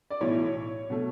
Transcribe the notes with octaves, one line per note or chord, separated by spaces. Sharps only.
D5
B1 A2 E3 A3 C#5
B2 A3